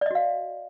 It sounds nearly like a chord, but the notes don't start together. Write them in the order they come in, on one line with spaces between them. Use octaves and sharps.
D5 D#5 F#4 F5